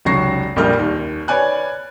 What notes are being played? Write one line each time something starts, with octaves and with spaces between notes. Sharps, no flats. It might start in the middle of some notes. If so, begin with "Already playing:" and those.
F1 C#2 F#3 C#6 A#6 C7
A#1 F2 A#2 G3 F6 G6
D#2
B4 C#5 D5 G#5 F#6